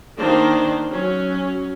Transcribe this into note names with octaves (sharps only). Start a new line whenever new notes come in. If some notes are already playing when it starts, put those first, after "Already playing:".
D#3 A#3 D4 C5
F#3 C#4